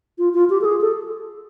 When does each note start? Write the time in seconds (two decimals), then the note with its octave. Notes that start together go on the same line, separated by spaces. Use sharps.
0.18 F4
0.34 F4
0.50 G4
0.61 A4
0.65 G#4
0.81 A4